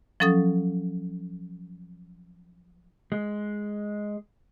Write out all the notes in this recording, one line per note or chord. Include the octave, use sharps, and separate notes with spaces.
F3 F#3 C#4 A4 D#6 A6
G#3